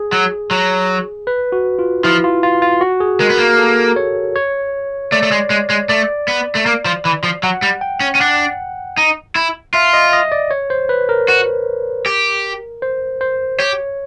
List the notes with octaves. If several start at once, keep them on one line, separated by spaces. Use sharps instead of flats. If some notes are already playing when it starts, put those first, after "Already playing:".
Already playing: G#4
F#3
F#3
B4
F#4
F4
F3 E4
F4
F4
F4
F#4
G#4
G#3 A#4
B3
A#3
A4
C#5
C#5
A3 D5
A3
G#3
G#3
G#3
A3 D5
B3
A3
A#3
F3
E3
F3
F#3 F#5
G3
G5
C#4
C#4
D4 F#5
D#4
E4
F4 E5
D#5
D#5
D5
C#5
C5
B4
A#4
F#4
G4
C5
C5
G4 C#5